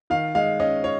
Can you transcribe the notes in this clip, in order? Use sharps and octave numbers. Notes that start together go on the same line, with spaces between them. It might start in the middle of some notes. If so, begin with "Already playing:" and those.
D#3 F5
G#3 F5
C#4 D#5
C#5